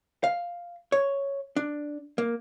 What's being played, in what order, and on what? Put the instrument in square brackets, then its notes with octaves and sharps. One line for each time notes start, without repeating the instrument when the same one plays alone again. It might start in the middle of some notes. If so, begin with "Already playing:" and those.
[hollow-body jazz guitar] F5
C#5
D4
A#3